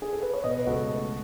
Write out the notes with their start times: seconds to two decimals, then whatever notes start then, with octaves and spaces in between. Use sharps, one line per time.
0.02 G#4
0.13 A4
0.22 B4
0.34 C#5
0.44 B2 B4 D#5
0.59 B4
0.66 C#2 F#4 A4
0.90 A3